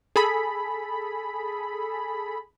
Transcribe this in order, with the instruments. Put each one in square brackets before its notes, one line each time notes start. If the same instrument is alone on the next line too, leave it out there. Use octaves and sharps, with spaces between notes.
[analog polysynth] G#4 A4 B5